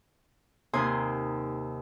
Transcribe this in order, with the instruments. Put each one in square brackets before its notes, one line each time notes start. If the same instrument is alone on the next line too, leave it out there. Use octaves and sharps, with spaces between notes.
[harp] D#2 C3 D#4 G#5 C6 D#6